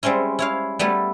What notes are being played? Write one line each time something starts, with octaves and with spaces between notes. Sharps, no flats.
G3 G#3 C4 C#4 E4
E4 C#5 F5
G3 A3 B3 E4 A4